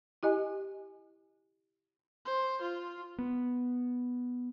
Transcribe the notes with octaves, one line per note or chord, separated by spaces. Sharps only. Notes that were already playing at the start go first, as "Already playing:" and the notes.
E4 G4 D#5 G#5
C5
F4
B3